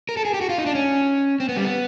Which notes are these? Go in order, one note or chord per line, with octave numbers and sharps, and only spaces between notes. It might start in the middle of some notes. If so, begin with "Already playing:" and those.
A#4
A4
G#4
G4
F#4
F4
D#4
D4
C#4
C4
B3
G3
B3